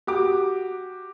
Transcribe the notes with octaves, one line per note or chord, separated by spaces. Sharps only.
F#4 G4 D6